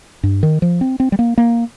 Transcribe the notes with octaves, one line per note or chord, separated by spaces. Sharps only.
G2
D#3
F3
C4
C4
G3
A#3
A#3